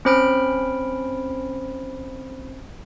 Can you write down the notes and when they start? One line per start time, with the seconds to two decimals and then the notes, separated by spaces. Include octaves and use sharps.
0.05 C4 C#4 C5 B5 F6 D7